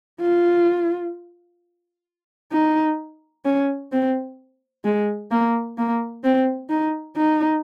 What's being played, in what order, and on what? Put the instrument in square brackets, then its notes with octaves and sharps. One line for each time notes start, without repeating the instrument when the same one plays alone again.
[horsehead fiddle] F4
D#4
C#4
C4
G#3
A#3
A#3
C4
D#4
D#4